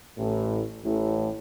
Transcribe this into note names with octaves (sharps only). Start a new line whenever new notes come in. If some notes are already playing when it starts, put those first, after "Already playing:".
A1 A2
A1 A2